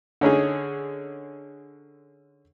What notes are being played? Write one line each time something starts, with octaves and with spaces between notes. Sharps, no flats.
D3 C#4 D#4 G#4